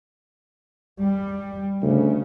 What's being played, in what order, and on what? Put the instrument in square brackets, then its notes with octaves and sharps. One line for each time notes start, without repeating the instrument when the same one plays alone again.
[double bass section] G3
[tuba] D2 [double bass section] C#3